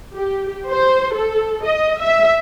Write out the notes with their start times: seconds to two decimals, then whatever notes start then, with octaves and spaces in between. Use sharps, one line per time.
0.14 G4
0.69 C5
1.14 A4
1.62 D#5
2.00 E5